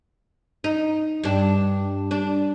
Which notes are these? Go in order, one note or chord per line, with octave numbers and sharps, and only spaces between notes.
D#4
G2 D4
D4